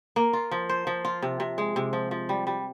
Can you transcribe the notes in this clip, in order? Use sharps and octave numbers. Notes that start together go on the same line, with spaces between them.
A#3
F4
F3
C5
F3
F4
C3
C3
G#3
C3
F3
F3
G3
G3